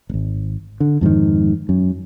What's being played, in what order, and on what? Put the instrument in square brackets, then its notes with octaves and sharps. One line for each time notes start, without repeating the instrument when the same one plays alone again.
[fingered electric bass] D#1 G#1
D3
F2 G#2 C3 D#3
F#2